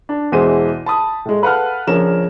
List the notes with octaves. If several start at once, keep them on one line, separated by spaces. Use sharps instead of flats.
D4
E2 B2 E3 G#3 C5 D#7
A5 B5 D#6
A2 G#3
A4 B4 F5 F#5 A5 F6
A#1 C#3 F3 C#4 A#4 E7